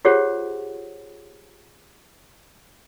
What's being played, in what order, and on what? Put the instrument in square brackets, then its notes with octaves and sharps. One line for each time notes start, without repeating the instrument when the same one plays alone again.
[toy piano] F4 G4 G#4 C5 C#5 F#5